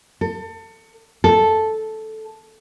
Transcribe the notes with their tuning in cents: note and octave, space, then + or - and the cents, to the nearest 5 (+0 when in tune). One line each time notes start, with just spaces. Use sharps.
A4 +30
A4 -5